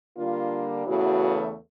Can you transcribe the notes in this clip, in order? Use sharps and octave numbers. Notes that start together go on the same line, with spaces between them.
D3 G3 A#3 D4 F4
E2 C#3 E3 A3 F#4